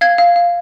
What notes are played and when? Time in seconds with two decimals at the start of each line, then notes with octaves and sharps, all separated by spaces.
0.01 F5 G#6
0.18 F5
0.36 F5